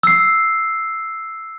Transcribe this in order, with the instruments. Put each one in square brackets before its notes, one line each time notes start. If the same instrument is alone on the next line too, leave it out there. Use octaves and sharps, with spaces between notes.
[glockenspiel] E6 C7